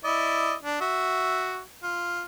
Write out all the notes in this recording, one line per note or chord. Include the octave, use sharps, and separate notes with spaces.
E4 D5 D#5
D4
F#4 E5
F4